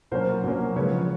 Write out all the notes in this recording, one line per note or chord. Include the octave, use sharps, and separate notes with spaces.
B2 F#3 A#3 C#4 A#4 C5
B2 F#3 A#3 C#4
C#3 F3 G#3 B4 C#5